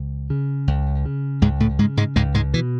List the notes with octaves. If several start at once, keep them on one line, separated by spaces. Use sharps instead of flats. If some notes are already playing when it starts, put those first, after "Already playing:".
Already playing: C#2
C#3
C#2
C#3
C#2 G#2 G#3
A2 A3
G#2 C#3 G#3
G#2 G#3
C#2 G#2 G#3
G#2 G#3
B2 E3